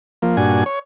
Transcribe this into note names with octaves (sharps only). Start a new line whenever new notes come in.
F3 A#3
G2 A#2 D4 F#4 G#5
C#5